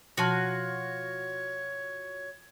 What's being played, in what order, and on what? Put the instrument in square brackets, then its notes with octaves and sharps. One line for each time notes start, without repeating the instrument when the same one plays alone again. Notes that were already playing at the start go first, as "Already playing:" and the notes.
[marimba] B2 F3 A5 [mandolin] F4 F#4 [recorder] C#5